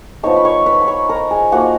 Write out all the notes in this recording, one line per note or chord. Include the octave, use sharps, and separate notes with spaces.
F3 B3 D#4 C#5 C#6
B5
C#5 C#6
B4 B5
B5
C#5 C#6
A#4 A#5
G#4 G#5
F3 A#3 D#4 F#4 F#5